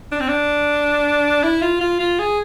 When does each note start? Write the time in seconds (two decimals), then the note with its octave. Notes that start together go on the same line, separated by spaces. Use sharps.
0.12 D4
0.20 C4
0.28 D4
1.44 E4
1.62 F4
1.81 F4
2.00 F4
2.19 G#4